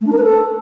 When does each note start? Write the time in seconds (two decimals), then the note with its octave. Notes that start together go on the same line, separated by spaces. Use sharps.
0.01 A3
0.06 D4
0.12 A#4
0.17 B4
0.23 A4